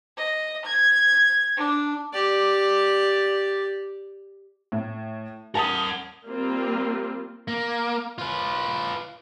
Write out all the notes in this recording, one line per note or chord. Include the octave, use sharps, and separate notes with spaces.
D#5
G#6
D4
G4 D5
A2
A#4 F#5 A5 D#6
G3 A#3 C4 F4
A#3
F4 B4